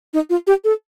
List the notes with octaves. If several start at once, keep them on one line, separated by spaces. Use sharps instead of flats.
D#4
F4
G4
A4